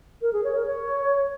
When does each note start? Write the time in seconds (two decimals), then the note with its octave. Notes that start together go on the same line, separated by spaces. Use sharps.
0.22 A#4
0.33 G#4
0.44 C#5
0.55 A#4
0.66 C#5